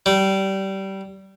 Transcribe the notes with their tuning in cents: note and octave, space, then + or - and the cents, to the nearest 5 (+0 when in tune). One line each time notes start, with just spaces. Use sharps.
G3 -20